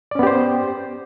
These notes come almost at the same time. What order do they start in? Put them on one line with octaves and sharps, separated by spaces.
D5 C#4 B3 G4 C5